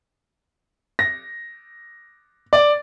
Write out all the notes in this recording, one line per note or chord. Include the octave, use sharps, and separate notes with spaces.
A#6
D5